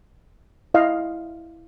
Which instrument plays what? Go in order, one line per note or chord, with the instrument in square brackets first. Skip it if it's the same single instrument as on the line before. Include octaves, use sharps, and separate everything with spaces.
[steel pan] E4 D#5 F5